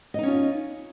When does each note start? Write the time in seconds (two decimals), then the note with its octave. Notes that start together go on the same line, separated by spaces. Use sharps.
0.14 D#5
0.19 D#4
0.23 C#4
0.28 F4